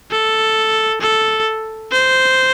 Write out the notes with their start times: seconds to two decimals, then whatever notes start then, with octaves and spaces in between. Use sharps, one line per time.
0.11 A4
1.01 A4
1.91 C5